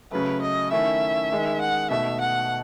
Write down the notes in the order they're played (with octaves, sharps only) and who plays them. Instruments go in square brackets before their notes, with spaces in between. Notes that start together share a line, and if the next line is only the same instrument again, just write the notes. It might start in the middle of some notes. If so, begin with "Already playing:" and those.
[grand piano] C#3 F#3 A3 [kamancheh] B4
[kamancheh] D#5
[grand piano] D#3 A3 C#4 E4 [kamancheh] E5
[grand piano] D#3 G#3 D#4
[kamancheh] F#5
[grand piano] B2 A3 D#4 [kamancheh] E5
[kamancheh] F#5